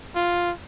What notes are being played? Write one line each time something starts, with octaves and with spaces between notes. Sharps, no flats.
F4